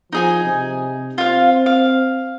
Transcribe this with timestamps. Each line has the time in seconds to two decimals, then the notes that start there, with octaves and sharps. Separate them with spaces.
0.12 F3 D#4 G#4 G#5
0.45 C3
1.18 C4 F4 F5
1.66 F5